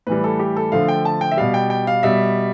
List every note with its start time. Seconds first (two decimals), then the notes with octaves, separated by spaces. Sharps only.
0.07 A2 E3 G3 B4
0.24 A4
0.39 G4
0.57 A4
0.72 D3 F3 A3 F5
0.88 G5
1.05 A5
1.21 G5
1.32 E5
1.37 B2 G3 F5
1.54 G5
1.70 G5
1.87 F5
2.03 B2 G3 E5